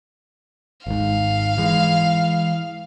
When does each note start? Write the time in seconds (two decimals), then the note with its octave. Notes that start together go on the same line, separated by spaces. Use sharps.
0.87 G#1 G#2 F5
1.58 E3 G#3